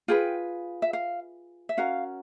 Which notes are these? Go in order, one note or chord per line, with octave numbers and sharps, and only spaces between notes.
F4 G#4 B4 G5
E5
F5
E5
C#4 F#4 A#4 F5